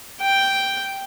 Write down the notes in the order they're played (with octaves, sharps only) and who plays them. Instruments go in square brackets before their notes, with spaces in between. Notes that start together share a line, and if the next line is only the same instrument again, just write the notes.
[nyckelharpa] G5